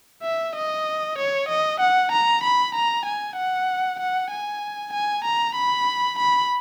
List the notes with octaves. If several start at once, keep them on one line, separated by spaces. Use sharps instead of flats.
E5
D#5
C#5
D#5
F#5
A#5
B5
A#5
G#5
F#5
F#5
G#5
G#5
A#5
B5
B5